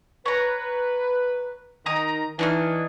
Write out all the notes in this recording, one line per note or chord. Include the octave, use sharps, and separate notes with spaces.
B4 C#5 A#5
D#3 A#5 D#6
E3 D4 D#4 F6